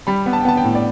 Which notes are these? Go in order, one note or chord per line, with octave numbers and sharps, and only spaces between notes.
G3 B5
B3
A5
G5
B3 A5
G5
A2
D5